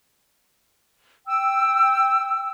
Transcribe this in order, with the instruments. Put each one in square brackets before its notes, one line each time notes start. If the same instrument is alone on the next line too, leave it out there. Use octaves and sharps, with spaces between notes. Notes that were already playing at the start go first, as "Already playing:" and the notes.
[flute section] G5 E6